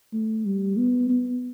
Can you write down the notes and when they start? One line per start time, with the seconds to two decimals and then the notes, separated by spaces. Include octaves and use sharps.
0.13 A3
0.45 G3
0.77 B3
1.09 B3